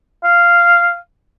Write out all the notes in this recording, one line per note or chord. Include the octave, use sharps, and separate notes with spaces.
F5